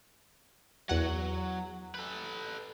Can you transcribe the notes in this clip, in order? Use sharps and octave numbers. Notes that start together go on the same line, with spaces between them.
E2 F#3 F#5
A4 B4